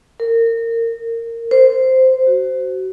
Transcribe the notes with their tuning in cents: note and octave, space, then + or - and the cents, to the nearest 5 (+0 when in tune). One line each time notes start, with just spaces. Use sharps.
A#4 -25
C5 -10
F#4 +25